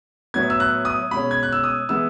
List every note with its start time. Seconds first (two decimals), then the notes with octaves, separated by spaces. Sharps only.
0.34 A2 F#3 B3 G#6
0.50 E6
0.60 F#6
0.85 D#6
1.11 B2 G#3 C#4 B5
1.31 G#6
1.43 F#6
1.52 E6
1.64 D#6
1.89 E3 G#3 B3 E6